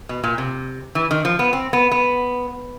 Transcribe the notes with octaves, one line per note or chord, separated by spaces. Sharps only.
B2
A#2
C3
E3
D#3
F3
B3
C4
B3
B3